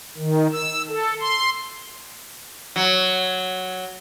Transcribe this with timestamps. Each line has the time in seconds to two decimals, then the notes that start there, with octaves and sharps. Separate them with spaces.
0.17 D#3
0.52 E6
0.89 A4
1.21 C6
2.76 F#3